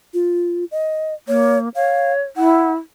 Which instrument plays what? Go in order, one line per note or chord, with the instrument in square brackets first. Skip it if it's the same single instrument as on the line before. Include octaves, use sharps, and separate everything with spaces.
[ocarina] F4
D#5
[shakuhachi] A#3 [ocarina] C#5
[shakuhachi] C#5 [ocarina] F5
[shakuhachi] E4 [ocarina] F#5